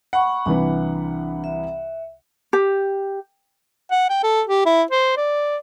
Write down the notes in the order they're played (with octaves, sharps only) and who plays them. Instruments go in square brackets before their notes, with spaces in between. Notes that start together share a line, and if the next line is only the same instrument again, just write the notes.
[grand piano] F#5 [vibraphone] B5 C#6
[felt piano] C2 E3 B4 [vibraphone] D4
[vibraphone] E5
[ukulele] G4
[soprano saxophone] F#5
G5
A4
G4
E4
C5
D5